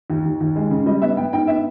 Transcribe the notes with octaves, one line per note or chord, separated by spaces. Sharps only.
D#2
D#2
D#2
G#3
C#3
G3 D#5
B3 E5
B3 G5
G#2 G5
B3 E5